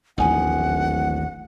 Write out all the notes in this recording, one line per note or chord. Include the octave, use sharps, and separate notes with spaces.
D1 A1 D#2 F3 D#4 F#5 G#5